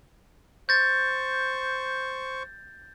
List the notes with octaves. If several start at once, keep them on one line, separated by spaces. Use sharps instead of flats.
C5 C#6 G6 A6